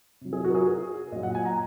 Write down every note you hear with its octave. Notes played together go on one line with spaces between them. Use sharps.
C3 F#3
G#4
F#4
A#4
G#4
A#2 F#3 D#5
F#5
G#5
A#5